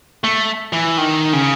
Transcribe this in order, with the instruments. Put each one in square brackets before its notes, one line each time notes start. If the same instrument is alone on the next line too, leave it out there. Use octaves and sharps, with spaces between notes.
[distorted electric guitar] A3
E3
D#3
C#3